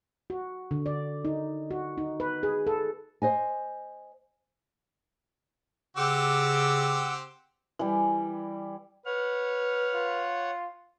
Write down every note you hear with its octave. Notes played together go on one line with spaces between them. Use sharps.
F#4
D3
D5
D#4
F#4
D#4
B4
G#4
A4
C5 D#5 G#5
C#3 C4 G4 F#5 D6 E6
E3 G3
B4 C#5 F#5 F6
F4